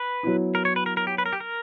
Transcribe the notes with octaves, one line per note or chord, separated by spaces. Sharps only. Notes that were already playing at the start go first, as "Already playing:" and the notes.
Already playing: B4
F#3 B3 E4
A#4
C#5
B4
A#4
A#4
G4
B4
A#4
G4
A#4